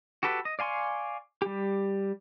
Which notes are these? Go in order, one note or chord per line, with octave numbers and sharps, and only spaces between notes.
F#4 G4 A4 B4
D#5
D5 F5 G#5 C6 C#6
G3 G4